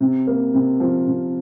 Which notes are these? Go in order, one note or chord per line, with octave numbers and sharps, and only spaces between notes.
C3
A#3
C3
F3
C3